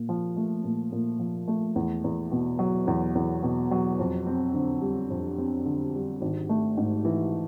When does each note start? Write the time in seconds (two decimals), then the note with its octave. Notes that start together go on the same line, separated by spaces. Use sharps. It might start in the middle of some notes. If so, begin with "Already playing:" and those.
Already playing: A#2
0.09 F3
0.37 A3
0.64 A#2
0.92 A#2
1.19 F3
1.48 A3
1.76 E2
2.04 E2
2.32 B2
2.59 F#3
2.87 E2
3.15 E2
3.43 B2
3.71 F#3
3.99 F2
4.27 C4
4.54 D3
4.82 G3
5.10 F2
5.38 C4
5.66 D3
5.94 G3
6.21 G#1
6.49 A3
6.77 G#2
7.05 E3